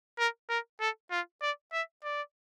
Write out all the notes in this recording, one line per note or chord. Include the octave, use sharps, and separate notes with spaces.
A#4
A#4
A4
F4
D5
E5
D5